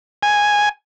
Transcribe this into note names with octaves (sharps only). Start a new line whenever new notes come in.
G#5